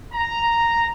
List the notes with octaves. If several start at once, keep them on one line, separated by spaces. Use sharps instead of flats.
A#5